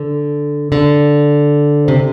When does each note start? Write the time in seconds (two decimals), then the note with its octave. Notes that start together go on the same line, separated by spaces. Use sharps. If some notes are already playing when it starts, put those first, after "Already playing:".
Already playing: D3
0.72 D3
1.88 C3